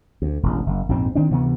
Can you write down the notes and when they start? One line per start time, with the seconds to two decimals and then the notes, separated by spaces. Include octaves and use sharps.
0.22 D2
0.43 E1 A1
0.66 F#1
0.89 A#1 F2 G#2 C4
1.15 D#3 C4 D4
1.30 D2 C3 E3 B3